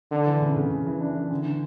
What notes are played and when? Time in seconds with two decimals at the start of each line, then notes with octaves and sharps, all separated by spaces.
0.11 D3 D4
0.26 E3
0.41 C#3
0.56 C#3
0.71 C#3
0.87 E3
1.00 D4
1.16 E3
1.30 D3
1.46 D3